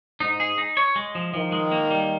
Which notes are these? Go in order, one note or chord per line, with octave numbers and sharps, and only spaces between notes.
G#2 D#4
G#4
D#4
C#5
G#3
F3
D#3 F3
G#3
A#3
G3